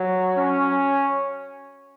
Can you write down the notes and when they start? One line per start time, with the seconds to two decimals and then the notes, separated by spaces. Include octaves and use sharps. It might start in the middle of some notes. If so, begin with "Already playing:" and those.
Already playing: F#3
0.37 C#4